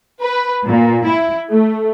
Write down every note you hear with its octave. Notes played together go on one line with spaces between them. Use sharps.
B4
A#2
E4
A3